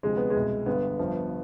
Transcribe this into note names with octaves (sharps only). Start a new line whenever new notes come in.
D2 C3 F3 G#3
B3
G#3
C2 B2
G1 G2 D3 B3
G1 G2 F3